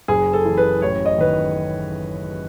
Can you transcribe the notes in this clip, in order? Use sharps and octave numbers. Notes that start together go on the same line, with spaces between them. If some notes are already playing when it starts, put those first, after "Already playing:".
F#1 G#4
A4
E3
B4
A1 C#5
D#5
D#3 B4